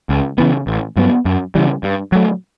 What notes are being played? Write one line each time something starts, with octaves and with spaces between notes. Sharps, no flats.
C#2
C#3 E3 B3
A1
G2 F#3 B3
F#2
C#3 E3 G3
G2
F#3 A3